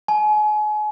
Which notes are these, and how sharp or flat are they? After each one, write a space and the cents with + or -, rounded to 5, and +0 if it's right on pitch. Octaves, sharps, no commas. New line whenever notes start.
G#5 +35